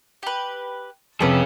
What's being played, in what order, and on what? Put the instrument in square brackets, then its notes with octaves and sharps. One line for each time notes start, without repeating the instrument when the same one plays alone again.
[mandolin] G4 B4
[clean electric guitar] F2 A2 C3 [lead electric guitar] C#4 G#4 [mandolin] A4 B4